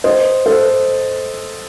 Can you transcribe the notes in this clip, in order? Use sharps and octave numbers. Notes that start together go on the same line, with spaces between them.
C5 D#5
A4 C5